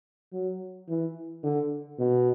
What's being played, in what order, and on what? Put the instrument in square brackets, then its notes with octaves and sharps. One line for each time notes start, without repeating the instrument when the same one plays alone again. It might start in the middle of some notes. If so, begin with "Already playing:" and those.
[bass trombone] F#3
E3
D3
B2